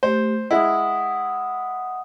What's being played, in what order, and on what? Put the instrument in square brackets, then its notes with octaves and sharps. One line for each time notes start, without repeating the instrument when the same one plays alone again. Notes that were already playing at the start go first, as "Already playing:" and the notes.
[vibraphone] A3 G4 [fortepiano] C5
[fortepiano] G#3 E4 [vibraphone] F#5 D#6